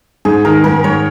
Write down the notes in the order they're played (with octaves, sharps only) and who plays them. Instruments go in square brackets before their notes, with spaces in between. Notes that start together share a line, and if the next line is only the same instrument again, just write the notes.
[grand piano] G#2 [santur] G#4
[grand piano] D#3 [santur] A#4
[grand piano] G#2 [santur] A#4
[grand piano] G#2 [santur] C#5